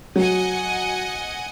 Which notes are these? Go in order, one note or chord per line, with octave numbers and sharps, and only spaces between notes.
F#3 D#5 F#5 G#5